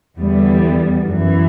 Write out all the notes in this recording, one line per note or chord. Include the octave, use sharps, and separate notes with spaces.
E2 D3 G3 B3
F#2 E3